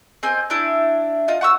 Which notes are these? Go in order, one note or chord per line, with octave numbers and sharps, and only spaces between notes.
C4 D#5 G#5 G6
D4 E4
F4 D#5
F#5 C#6 E6